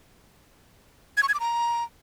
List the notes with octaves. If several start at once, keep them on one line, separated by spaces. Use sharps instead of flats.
G#6
C#6
G#6
D6
A#5